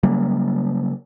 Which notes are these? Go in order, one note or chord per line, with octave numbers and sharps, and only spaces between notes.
C#3 F#3 G3 A#3